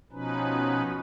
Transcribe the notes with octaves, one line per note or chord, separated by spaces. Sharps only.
B2 F3 C#4 D#4 B4